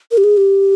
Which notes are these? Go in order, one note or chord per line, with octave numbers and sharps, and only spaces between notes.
A#4
G4
G#4
G4